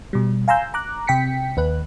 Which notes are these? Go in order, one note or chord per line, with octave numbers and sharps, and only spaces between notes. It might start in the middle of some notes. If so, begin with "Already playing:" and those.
B2 G3
F5 G#5 A#5 C6 E6 G6
A#5 D6 F#6
C3 G5 B6 C#7
D#2 B4 F#6